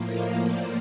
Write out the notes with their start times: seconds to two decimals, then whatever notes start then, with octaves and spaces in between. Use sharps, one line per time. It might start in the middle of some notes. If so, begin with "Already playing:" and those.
Already playing: A2 F3 A#3
0.08 D#5 F5
0.42 C5 D5